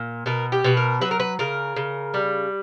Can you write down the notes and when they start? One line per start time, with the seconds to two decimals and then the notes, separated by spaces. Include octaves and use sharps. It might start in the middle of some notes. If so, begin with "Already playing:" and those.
Already playing: A#2
0.26 B2 A#4
0.52 G4
0.64 B2 B4
0.77 A#4
1.01 F#3 B4
1.11 A#4
1.20 B4
1.39 C#3 A#4
1.76 C#3
2.14 G3